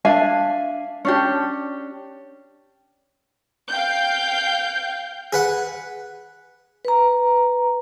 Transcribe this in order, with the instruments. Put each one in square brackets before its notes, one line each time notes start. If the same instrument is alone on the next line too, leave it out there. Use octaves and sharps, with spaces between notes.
[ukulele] D4 E5 F5 G#5
C#4 D4 G4
[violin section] F5 G5 G6
[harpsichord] G#4 B4 F#5
[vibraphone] B4 A#5